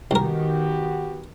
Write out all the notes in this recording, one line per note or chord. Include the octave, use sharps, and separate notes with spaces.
C2 D#3 B3 F#4 G4 A#4